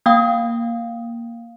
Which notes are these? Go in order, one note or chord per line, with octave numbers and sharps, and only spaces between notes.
A#3 F5 G5 D#6